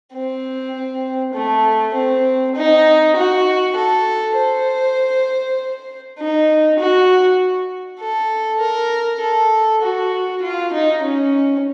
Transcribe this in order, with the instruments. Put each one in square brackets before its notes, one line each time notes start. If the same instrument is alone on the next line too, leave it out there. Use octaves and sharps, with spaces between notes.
[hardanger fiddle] C4
A3
C4
D#4
F#4
A4
C5
D#4
F#4
A4
A#4
A4
F#4
F4
D#4
C#4